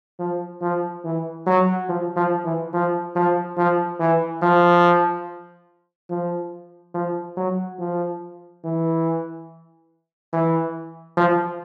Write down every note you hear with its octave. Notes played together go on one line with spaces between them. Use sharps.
F3
F3
E3
F#3
F3
F3
E3
F3
F3
F3
E3
F3
F3
F3
F#3
F3
E3
E3
F3